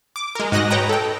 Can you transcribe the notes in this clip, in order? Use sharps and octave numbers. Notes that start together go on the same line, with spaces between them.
D6
G#3 A#4
G#2 F#4 D#5 F#6 A#6
B4 C#5 D#5 G5 A#5
A4 G5